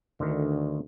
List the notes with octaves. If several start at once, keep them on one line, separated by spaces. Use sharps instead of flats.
D2 D3 D#3